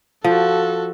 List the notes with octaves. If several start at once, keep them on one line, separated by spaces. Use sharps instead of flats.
F3 F#4 A4